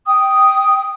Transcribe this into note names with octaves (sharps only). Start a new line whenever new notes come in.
G5 D#6